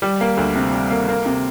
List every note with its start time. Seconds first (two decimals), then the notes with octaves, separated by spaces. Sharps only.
0.02 G3
0.21 A#3
0.37 D2
0.56 C3
0.72 G3
0.90 A#3
1.08 A#3
1.26 C3